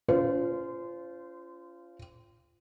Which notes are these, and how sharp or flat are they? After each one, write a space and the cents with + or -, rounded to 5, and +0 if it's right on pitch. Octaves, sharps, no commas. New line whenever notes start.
C#4 +35 F4 -15 C5 -25